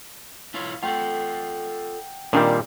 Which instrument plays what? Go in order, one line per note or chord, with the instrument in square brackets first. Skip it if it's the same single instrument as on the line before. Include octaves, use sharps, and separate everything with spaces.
[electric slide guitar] E4 F4 C#5
[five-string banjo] A3 [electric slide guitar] F4 A4 [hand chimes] F#5 G5 G6
[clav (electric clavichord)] A#2 D#3 G3 [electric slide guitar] C4 [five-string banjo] D4 A#4